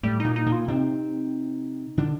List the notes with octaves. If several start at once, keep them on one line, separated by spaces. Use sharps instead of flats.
A2 G3 A3
A#2 A#3 D#4
D#4
A#2 A#3
F4
C3 C4 D#4
D3 D4